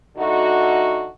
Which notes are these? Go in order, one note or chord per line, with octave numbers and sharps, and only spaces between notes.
D3 A3 D#4 F#4